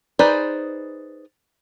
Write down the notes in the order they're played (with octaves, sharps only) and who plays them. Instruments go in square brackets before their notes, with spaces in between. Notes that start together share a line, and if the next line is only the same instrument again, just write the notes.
[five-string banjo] D#4 G#4 B4 C5 D5